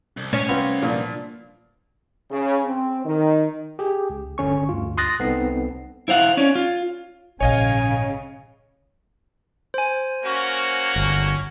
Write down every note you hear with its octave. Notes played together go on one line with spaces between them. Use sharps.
C2
C#4 C#5
B3 C4 F4
A#2 F3 D4
C#3
C4
D#3
G4 G#4
C#2
G1 D3 C#4 C#6
D2 G2 F4
C6 D#6 F#6 A6 A#6
C2 B3 C4 D#4 A4 C7
E4 C5 F5 F#5
C#4 D4 C#5
F4
A#1 G#2 C#3 C#5 D#5 F5 G#5
C5 G#5
A#3 C#4 F#4
G1